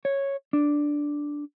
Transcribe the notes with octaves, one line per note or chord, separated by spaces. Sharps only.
C#5
D4